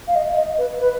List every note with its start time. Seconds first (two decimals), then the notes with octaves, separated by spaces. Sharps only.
0.08 F5
0.15 D#5
0.37 D#5
0.58 B4
0.79 B4